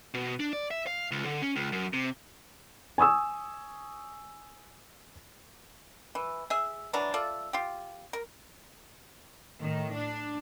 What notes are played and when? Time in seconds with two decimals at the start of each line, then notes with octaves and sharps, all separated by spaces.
0.14 B2
0.40 D4
0.53 D5
0.71 E5
0.87 F5
1.11 C#2
1.25 D3
1.42 C#4
1.56 C#2
1.72 F#2
1.93 C3
2.98 G#5 C#6 D#6 E6
6.15 E3
6.50 G#4 E5
6.93 E3 F#3 D4 A#5
7.14 F4 A4 D5 E5
7.53 F4 G4
8.13 A#4
9.59 A2 D#3
9.94 D4